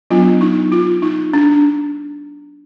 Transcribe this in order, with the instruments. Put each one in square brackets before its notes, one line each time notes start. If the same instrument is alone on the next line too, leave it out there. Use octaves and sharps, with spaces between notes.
[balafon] F#3 B3 D4 F4
D#4
F4
D#4
D4